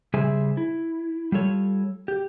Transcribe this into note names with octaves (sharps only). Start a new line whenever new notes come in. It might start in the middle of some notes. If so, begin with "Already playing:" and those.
C#3 G3 G#4 C5 E5 G#5
E4
G3 F4 A4 C#5
G4